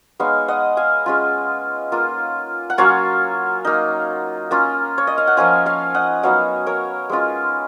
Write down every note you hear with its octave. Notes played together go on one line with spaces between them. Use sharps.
G#3 B3 D#4 C#5 F5
D#5 F#5
F5 G#5
G#3 C#4 F4
A#3 F4
F#5
F#3 A#3 C#4 F4 C#5 F5
A#3 D#4
A#3 C#4 F4
C#5
D#5
F5
F#5
F3 A#3 C#4 F4 F5 G#5
C#5 F5
D#5 F#5
F#3 B3 D#4 C#5 F5
A#4 C#5
G#3 C#4 F4